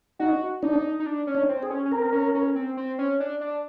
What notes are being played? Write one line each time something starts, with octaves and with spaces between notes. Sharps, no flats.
D#4 F#4
D4 D#4
D#4
D4
C#4
D4
C4
G#4
C#4
C#4
C4 A#4
C#4
C#4
C4
C4
C#4
D4
D4